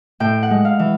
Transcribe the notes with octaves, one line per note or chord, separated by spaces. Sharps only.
A2 G5
F#5
G#3
F5
E3